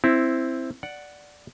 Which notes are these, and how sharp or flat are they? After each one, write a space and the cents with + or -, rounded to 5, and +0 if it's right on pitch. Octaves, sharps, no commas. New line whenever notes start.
C4 +0 E4 +0
D5 +0 F#5 +0